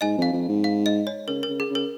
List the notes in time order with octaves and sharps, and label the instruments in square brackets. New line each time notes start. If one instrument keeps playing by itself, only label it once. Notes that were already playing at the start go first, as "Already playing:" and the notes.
[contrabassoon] G#2 [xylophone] D#5 G#5
[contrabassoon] F2 [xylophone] F5
[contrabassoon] F2
G#2
[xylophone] F5
D#5
C#5
[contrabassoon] C#3 [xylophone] A#4
[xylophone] A#4
[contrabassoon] C#3
[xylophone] G#4
[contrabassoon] C#3
[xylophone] A#4